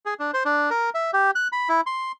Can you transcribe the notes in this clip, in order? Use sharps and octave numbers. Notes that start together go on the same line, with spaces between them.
G#4
D4
C5
D4
A#4
E5
G4
F#6
B5
E4
C6